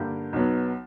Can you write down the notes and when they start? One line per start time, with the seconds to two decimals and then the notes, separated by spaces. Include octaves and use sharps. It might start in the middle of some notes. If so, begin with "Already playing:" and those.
Already playing: G2 D3 A#3 D4 G4
0.33 B1 B2 F#3 B3